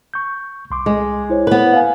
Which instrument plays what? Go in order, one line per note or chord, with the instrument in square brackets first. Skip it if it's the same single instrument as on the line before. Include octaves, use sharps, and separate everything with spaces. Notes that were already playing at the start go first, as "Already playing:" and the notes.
[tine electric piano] C#6 G6
C2 C6 D6
[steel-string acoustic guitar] G#3
[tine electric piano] E4 C5 C#5
[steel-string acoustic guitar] B3 B4
[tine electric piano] F5 G#5